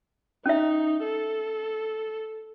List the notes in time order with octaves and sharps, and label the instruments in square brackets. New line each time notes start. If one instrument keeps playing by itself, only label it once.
[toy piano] C#4 E5 [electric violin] D#4
[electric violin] A4